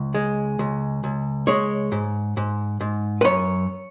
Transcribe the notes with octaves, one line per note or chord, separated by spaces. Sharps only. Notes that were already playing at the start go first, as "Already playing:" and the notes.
Already playing: C#2
G#3
C#2
C#2
G#3 C#5
G#2
G#2
G#2
B4
F#2 C#5